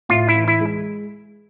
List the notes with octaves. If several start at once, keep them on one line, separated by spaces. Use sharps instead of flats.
A2 F4
E4
E3
E4
G#3